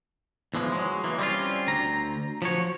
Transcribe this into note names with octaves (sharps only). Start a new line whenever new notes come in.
E2 E3 F3 G#3
F#3 G#3
E3 A#3
G3 C4 C#4 F4
D2 A#5
F3 F#3 C#5